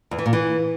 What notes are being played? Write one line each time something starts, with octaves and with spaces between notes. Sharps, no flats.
E2
E3
A#2
E3